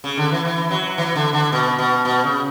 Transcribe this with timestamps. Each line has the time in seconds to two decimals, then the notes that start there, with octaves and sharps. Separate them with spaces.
0.04 C#3
0.17 D3
0.31 E3
0.45 E3
0.71 F#3
0.98 E3
1.16 D3
1.33 D3
1.52 B2
1.79 B2
2.05 B2
2.24 C#3